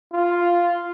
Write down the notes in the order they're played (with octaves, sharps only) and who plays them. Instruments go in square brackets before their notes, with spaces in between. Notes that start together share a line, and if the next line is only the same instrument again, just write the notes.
[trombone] F4